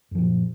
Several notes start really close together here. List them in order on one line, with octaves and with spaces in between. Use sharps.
F#2 F3 A#2